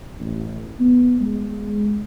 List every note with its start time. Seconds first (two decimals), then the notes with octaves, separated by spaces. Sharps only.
0.20 A1
0.79 B3
1.21 G#3